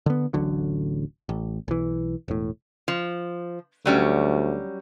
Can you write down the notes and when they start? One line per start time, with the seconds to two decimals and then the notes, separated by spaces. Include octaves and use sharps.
0.06 D3 B3
0.33 D1 A1 D3 F#3
1.29 A1
1.68 B1 E3
2.28 E1 A2
2.88 F3
3.85 D2 F#3 G3 C#4